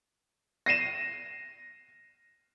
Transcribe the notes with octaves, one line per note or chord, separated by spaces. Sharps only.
A#6 C7 D#7 E7